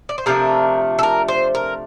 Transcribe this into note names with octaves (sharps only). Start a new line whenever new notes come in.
D5
C5
C3 F3 A3 D4 A#4
A4
A#4
C5
A#4